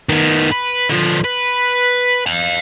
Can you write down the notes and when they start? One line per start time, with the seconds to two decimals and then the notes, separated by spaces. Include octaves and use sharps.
0.09 D#3 B3
0.51 B4
0.89 D3 F3
1.24 B4
2.26 F5 G5